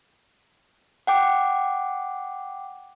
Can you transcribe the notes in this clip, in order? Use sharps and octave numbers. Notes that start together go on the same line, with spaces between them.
F#5 G5 D6